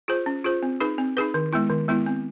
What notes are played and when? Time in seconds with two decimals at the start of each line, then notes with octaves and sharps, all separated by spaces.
0.08 F4 G#4 C5
0.26 C#4
0.44 F4 G#4 C5
0.63 C4
0.81 D#4 G#4 B4
0.98 C4
1.17 D#4 G#4 B4
1.34 D#3
1.53 G#3 B3 E4
1.70 D#3
1.88 G#3 B3 E4
2.06 C4